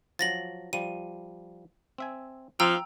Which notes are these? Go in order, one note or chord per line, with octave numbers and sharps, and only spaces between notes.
F3 F#3 A6 A#6 F#7
F3 G3 D#7
C4 E5 G#5
F3 C4 F4 G5 A#5 E6